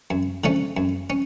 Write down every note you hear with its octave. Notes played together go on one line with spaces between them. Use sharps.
F#2
D3 F3 A3 C#4
F#2
C#4